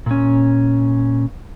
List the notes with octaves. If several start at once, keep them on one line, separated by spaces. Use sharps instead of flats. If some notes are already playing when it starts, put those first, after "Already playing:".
A#2 C#4